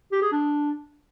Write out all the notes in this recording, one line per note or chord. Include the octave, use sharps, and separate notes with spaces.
G4
G#4
D4